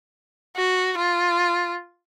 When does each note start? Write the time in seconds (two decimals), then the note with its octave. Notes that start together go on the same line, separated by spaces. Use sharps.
0.56 F#4
0.98 F4